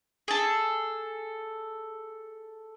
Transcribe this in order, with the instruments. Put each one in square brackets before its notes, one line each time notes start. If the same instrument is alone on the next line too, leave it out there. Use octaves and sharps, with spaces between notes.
[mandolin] G#4 A4